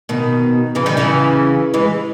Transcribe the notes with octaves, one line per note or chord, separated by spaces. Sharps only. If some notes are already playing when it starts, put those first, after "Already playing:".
B2 D#3
C#3 E3
D#3 G3
C#3 E3
E3 G#3